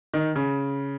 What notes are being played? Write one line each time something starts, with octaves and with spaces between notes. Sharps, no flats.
D#3
C#3